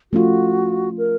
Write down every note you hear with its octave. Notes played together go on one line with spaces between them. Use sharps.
F3 A3 C#4 F4 F#4
A#4